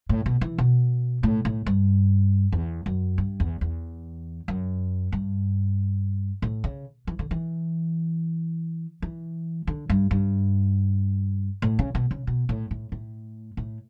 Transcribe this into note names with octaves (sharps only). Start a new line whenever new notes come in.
A2
B2
E3
B2
A2
A2
G2
E2
F#2
G2
E2
E2
F#2
G2
A2
C#3
E3
D3
E3
E3
D3
G2
G2
A2
C#3
B2
C#3
B2
A2
A2
A2
A2